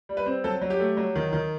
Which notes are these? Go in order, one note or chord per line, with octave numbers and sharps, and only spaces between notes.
G3
B4
C4
F#3 A4
F#3
G4
A3
F#3
D#3
D#3